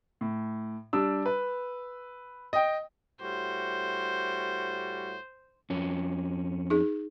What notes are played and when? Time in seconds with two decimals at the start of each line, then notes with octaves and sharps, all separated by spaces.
0.21 A2
0.93 G3 D4 E6
1.26 B4
2.53 D#5 G5
3.21 A2 G3 F#4 C5
5.70 F2 C#4
6.70 D#4 G#4